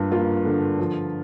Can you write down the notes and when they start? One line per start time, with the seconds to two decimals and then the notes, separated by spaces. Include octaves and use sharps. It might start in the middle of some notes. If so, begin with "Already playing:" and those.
Already playing: G2 A#3 F4
0.12 A#3 F4
0.45 D3
0.79 F3